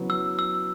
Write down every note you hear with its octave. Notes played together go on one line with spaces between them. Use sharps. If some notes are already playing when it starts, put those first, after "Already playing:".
Already playing: C#3 F#3 B3 E4
E6
E6